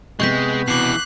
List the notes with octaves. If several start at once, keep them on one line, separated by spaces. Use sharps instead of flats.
C3 G#3 B3 C#6 G6 B6
B2 E3 D6 F#6 C7